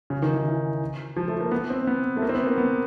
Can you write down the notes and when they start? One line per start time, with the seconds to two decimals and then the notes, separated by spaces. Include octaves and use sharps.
0.10 C#3
0.22 D#3
0.34 D#3
0.46 E3
1.17 F3
1.28 A3
1.41 A#3
1.51 B3
1.70 C4
1.87 B3
2.17 A3
2.22 A#3
2.29 C4
2.35 B3
2.46 A#3
2.58 B3